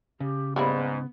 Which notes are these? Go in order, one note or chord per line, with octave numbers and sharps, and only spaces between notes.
C#3 G4
G#2 G3 A#3 B3 E4